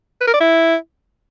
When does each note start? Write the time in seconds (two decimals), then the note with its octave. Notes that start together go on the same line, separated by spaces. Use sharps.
0.21 B4
0.27 A#4
0.34 D5
0.40 E4